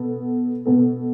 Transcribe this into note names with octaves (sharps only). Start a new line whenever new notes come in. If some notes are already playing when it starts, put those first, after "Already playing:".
Already playing: B2 B3 A4
B2 B3 A4